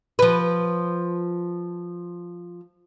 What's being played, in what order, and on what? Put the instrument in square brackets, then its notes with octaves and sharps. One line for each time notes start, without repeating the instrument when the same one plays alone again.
[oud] F3 B4